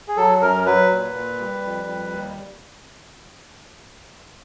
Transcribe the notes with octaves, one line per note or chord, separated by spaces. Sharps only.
G#4
F#3 A4
F#2 A#4
F#3 B4
A#2
A#2
G3
F2
G3
D#2